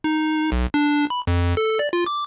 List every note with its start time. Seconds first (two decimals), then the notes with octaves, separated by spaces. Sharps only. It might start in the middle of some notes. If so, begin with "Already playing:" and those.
0.04 D#4
0.52 B1
0.74 D4
1.10 B5
1.27 F2
1.57 A4
1.79 D5
1.93 F4
2.06 D6